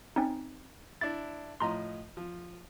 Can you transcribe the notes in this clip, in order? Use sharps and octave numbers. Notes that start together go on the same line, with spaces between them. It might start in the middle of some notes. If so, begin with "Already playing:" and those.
C4 C#4 D#4
D4 E4 A6
A2 F3 D#5 A#5 C6
F3